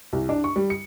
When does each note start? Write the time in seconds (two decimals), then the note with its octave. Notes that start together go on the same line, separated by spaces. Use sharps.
0.13 C2
0.29 D4
0.44 C#6
0.56 G3
0.70 C#7